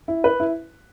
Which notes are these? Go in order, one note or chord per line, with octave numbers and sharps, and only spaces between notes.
E4
B4
E4